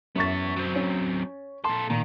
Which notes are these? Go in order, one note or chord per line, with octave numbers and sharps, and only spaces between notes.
F#2 B3 E5 C#6 A6
F#3 C4
C#4
A#2 A4 C6
A#2 D#3